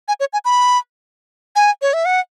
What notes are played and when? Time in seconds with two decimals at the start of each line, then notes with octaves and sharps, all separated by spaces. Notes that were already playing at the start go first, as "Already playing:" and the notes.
0.08 G#5
0.20 C#5
0.33 G#5
0.45 B5
1.56 G#5
1.82 C#5
1.93 E5
2.05 F#5